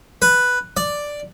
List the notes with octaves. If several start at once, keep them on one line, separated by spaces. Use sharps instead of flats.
B4
D5